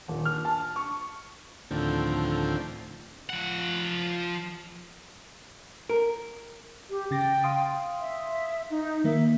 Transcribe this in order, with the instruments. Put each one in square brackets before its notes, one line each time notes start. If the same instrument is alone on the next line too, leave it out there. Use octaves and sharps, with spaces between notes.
[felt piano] D#1
F6
A5
C#6
[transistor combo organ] D2 A2 D3 D#3 F3 C4
[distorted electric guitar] F3 F#5
[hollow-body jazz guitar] A#4
[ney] G4
[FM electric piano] C#3 A6 A#6 [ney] G5
[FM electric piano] F5 C6 D#6
[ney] E5
D#4
[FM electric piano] D#3 A#3 [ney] E5